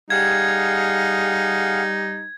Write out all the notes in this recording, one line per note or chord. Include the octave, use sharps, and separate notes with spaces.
G3 D#4 G#4 F5 F#5 G#6